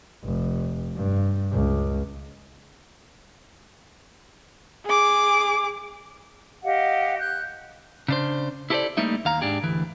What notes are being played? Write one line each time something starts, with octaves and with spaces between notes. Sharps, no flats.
F1
G2
C#2
G#4 D6
G4 D#5 F5 F#5
F#6 G6
C#3 D4 C5
E4 G4 A4 A#4 C5 D5
G3 A3 A#3 D#4 E5
D#2 F5 A#5
G#2 D4 G4 G#4
D2 E3